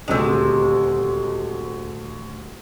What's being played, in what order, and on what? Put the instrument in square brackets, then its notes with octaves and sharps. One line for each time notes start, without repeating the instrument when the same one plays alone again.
[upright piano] D#1 D2 E6 [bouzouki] C3 G#3